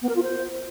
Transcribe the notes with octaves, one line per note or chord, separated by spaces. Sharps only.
B3
A#4
F4
C5